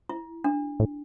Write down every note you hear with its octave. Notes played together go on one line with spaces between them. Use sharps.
E4
D4
A2